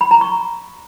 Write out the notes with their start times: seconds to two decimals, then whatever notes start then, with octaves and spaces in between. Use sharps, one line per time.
0.01 B5
0.11 A#5
0.21 C#6